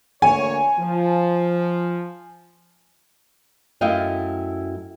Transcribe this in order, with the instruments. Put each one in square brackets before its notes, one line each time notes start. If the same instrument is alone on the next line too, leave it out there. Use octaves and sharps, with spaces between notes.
[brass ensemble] D2 A#3 C#5 [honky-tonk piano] G#5
[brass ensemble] F3
[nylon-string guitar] F#2 A3 E4 D#5 F5 G5